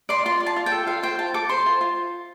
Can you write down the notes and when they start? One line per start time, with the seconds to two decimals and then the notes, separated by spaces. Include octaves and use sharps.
0.09 D5 C6
0.26 F4 C6
0.40 D5
0.46 A5
0.56 F4
0.66 G5
0.72 A4
0.87 F4 F5
1.03 C5 G5
1.19 F4 A5
1.34 A4 D6
1.49 C5 C6
1.66 F4
1.81 F4